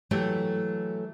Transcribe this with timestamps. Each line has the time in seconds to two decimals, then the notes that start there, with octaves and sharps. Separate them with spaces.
0.11 E3 F#3 A3 G4 A4